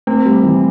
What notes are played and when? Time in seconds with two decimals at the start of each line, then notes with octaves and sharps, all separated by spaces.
0.07 A3 C4
0.25 G3
0.43 E3